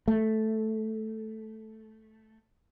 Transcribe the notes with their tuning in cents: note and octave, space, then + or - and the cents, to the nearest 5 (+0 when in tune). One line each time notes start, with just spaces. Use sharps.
A3 -5